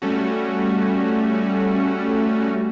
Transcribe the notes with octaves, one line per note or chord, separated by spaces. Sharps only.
G3 A3 C#4 F#4